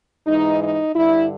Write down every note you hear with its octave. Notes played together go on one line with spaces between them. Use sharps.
G#2 E3 D#4
D#4
G2 D3 E4